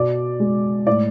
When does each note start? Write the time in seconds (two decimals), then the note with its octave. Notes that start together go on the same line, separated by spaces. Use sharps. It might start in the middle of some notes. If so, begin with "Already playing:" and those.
Already playing: B2 D5
0.40 G#3
0.87 A2 D5